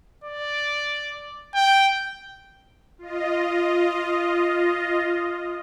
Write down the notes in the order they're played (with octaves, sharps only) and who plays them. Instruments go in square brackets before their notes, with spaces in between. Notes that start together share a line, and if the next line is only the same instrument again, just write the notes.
[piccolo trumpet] D5
G5
[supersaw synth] F4 D#5